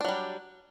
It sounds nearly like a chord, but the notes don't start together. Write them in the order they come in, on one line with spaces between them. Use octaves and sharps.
D4 F#3 G3